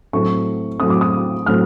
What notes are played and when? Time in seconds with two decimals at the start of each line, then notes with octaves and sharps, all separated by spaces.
0.13 A2 F#3 A3 C4 C#6
0.80 A2 F#3 A3 C4 D#6
0.90 D6
1.01 D#6
1.46 A2 F#3 A3 C4 F6